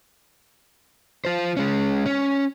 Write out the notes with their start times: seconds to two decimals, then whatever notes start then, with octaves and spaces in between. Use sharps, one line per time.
1.25 F4 C5
1.57 G#3 C#4
2.06 C#4